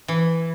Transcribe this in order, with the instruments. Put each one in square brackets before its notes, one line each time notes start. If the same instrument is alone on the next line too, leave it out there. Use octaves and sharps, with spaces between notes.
[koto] E3